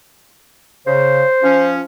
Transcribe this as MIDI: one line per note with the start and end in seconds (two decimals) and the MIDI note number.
0.87 1.23 49
0.87 1.77 72
1.43 1.80 53
1.43 1.80 61